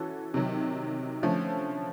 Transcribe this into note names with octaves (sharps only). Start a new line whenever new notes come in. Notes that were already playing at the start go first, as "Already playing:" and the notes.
Already playing: E3 C#4 F#4 A4
C3 D#3 F#3
D3 F3 A3 C#4